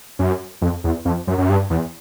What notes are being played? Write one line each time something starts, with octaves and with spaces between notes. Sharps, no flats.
F#2
F2
E2
F2
F#2
F#2
G2
E2